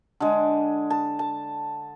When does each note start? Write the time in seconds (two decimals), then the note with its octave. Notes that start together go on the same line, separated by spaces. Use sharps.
0.20 D3 G#3
0.90 A5
1.19 A5